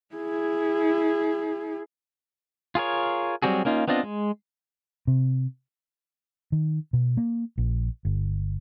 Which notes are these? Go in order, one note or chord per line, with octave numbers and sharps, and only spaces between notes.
E4 G#4
F4 G#4 A#4 C#5
F#3 G3 C4 F#4 G#4
A#3 C#4 D#4 F4
B3 C4 D4 F4 D#5
G#3
C3
D#3
B2
A#3
A#1
G1